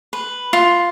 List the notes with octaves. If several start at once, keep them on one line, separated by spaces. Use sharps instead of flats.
B4
F4